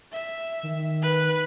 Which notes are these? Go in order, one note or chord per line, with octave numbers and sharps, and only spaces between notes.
E5
D#3
B4